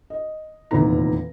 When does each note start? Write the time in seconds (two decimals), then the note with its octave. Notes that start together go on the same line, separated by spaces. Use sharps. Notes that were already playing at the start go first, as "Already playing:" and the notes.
0.10 D#5
0.71 F1 E2 A#2 D#3 A#5